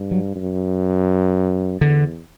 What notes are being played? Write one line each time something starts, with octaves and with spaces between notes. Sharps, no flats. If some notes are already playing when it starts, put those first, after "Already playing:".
Already playing: G2
F#3
F#2
E2 D3